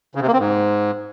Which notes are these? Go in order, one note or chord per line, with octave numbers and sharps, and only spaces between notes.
C#3
C3
A#3
C4
G#2